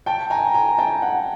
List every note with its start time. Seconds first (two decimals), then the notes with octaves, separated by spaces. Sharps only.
0.06 G5 A5
0.30 G#5 A#5
0.54 G#5 A#5
0.78 G5 A5
1.02 F#5 G#5